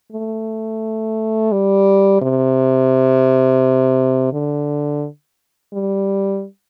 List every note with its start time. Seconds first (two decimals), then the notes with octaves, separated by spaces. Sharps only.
0.12 A3
1.52 G3
2.22 C3
4.33 D3
5.73 G3